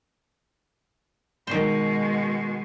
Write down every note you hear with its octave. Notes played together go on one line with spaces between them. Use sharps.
B2 D#3 G#3 C5